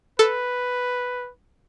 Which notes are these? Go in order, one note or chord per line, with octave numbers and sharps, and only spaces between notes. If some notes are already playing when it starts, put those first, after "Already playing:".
A4 B4